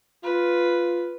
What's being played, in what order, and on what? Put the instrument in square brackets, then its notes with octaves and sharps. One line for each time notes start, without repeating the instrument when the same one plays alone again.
[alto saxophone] F4 [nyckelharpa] B4